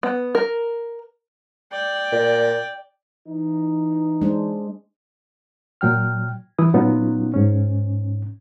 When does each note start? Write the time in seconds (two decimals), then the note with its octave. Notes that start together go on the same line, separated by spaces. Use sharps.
0.03 B3
0.35 A#4
1.72 D5 G5
2.12 A#2
3.27 E3 D#4
4.22 G#3 D4 C5
5.81 A#2 F#3 G5 F6
6.59 E3 E4 D#6
6.74 A#2 F#3 B3 C#4 D#4 F4
7.34 G#2 C#4